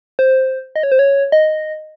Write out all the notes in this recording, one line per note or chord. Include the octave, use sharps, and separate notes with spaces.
C5
D#5
C#5
C5
C#5
D#5